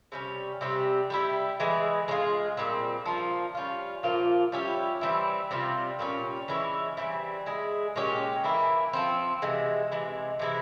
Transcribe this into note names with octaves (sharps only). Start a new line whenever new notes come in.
C3 G3 C#4
C3 G3 C4 G4
G3 C#4 E4 G4
E3 G#3 E4 G#4
G#3 C#4 F4 G#4
A#2 G3 C4
F3 A#3 F4
G3 C#4 F4
A#2 F3 A#3 F4
G3 C#4 E4 G4
E3 G3 C4 E4
C3 G3 C4 F4
A#2 G3 C#4
E3 G#3 C#4 E4
E3 G3 C4
G#3 E4 G#4
A#2 G#3 C#4 G4
E3 A#3 E4
F3 G#3 C4
C3 E3 G#3
C3 E3 G#3
C3 E3 G#3 E4